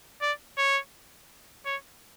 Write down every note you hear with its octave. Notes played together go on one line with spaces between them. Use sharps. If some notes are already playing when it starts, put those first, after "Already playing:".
D5
C#5
C#5